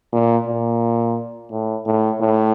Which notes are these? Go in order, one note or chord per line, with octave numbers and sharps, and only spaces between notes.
A#2
A#2
A2
A2
A2